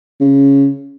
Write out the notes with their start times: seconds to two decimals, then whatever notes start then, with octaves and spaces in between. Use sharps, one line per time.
0.21 C#3